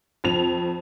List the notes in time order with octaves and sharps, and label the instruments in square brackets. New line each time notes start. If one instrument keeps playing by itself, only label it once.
[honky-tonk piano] F2 F7